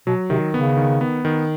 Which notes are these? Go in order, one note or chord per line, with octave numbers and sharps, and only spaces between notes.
B2 F#3
C3 D#3
C#3 B3
D#3
B3
D#3